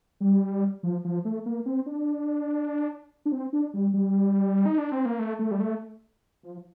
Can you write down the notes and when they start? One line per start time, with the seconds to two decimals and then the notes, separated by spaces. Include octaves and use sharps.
0.20 G3
0.83 F3
1.04 F3
1.25 A3
1.46 A#3
1.66 C4
1.86 D4
3.26 D4
3.32 C4
3.53 D4
3.74 G3
3.94 G3
4.66 D#4
4.78 D4
4.92 C4
5.05 A#3
5.19 A3
5.39 A3
5.51 G3
5.60 A3
6.43 F3